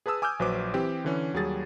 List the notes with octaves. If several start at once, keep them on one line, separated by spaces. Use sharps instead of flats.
G#4 B4 A5 D#6 E6
G#5 D6 E6 F6 G6
A#1 F#3 B4 C5 D6
E3 C4 G4
D3 E3 C#4
D#2 F#3 G3 G#4 A6